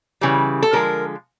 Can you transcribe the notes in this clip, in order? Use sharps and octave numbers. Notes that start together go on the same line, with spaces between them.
C#3 E3 G3
A4
D3 F3 G#3 A#4